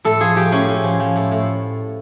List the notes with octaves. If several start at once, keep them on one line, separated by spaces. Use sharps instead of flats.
A2 A4
F3 G#4
F3 G4
A2 C#4
A2
F3
F3
A2
A2